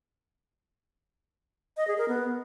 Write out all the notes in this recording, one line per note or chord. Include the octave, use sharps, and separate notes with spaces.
D#5
G#4
A#4
B3